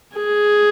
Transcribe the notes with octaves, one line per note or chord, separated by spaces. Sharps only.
G#4